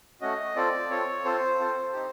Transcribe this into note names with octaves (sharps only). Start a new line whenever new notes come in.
A3 C#4 F#4 D#5
C4 F4 A4 D5
C4 F4 A4 C#5
C4 F4 A4 C5
C4 F4 A4
C4 D#4 G4